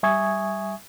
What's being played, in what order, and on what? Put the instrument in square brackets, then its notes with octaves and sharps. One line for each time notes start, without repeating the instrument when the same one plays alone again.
[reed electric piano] G3 E5 G#5 C#6 D#6 G#6